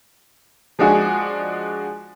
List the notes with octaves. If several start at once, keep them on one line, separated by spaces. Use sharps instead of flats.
F3 G#3 D4 F#4 G#4